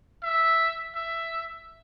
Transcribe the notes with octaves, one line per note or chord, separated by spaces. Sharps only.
E5
E5